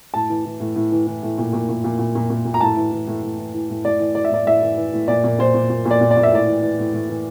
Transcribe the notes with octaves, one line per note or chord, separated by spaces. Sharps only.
A2 A5
E3
E3
A2
A2
E3
E3
A2
A#2
A#2
A#2
A#2
A#2
A#2
A#2
A#2
A#5
A2 A5
E3
E3
A2
A2
E3
E3
A2
A2 D5
E3
E3 D5
E5
A2 D5
A2 E5
E3
E3
A2
A#2 D5
A#2
A#2 C5
A#2
A#2
A#2
D5
A#2
D5
A#2
E5
A2 D5
E3
E3
A2
A2
E3